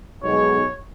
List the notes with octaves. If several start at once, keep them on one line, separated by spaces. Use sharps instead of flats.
B1 B2 G#3 C#5